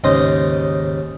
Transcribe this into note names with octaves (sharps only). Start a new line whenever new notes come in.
D#2 G#2 C#3 C5 D#5 D#6